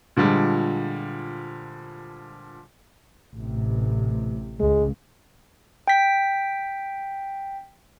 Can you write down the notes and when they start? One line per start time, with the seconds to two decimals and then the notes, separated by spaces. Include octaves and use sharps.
0.17 A#2 D3 F3 G3 G#3
3.35 A1 C3
4.60 C#2 G#3
5.88 G5 B6